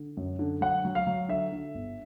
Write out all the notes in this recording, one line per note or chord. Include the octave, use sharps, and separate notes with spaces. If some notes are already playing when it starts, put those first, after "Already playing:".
Already playing: D3
F#2
D3
F#3 F#5
F#3
F5
F#3
D3 E5
D3
G1